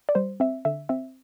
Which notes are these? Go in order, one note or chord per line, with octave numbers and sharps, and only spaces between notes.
D5
G3 C5
C4 E5
D3 E5
C4 E5